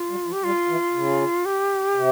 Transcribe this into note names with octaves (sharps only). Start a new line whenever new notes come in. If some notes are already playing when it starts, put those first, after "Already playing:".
Already playing: F4
G3
F3
G4
G3 F4
E3
C#3
G4
C3